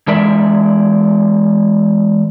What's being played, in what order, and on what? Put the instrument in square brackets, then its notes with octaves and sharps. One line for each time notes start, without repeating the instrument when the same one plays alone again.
[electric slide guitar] E3 G#3 A#4 D5 E5